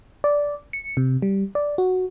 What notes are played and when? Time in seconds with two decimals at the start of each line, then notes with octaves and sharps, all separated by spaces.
0.24 D5
0.73 C#7
0.97 C3
1.22 G3
1.55 D5
1.78 F#4